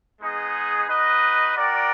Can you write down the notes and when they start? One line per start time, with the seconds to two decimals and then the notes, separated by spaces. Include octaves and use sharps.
0.21 G#3 B3 D#4 G#4
0.88 D#4 F#4 B4 D#5
1.55 F#4 A#4 D5 G5